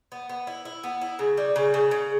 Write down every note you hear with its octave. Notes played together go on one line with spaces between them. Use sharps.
B3
B3
E4
E4
B3
E4
C#3
G3
C#3
C#3
C#3